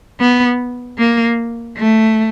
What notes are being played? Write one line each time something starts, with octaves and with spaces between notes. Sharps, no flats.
B3
A#3
A3